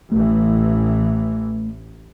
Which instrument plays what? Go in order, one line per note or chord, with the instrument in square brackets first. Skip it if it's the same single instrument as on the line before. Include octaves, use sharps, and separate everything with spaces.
[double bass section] A1 E3 [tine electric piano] A3